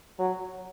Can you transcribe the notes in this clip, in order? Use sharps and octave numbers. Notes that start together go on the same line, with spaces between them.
F#3